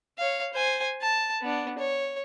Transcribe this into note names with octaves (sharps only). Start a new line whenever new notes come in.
C#5 F5
C5 G#5
A5
B3 D4
C#5